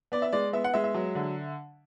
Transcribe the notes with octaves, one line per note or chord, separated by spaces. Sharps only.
B3 D5
E5
G#3 D5
B3 E5
F#5
G#3 E5
E5
F#3
D3